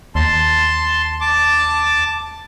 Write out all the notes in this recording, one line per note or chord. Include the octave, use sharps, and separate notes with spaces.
D#2 A5 C6
A5 D6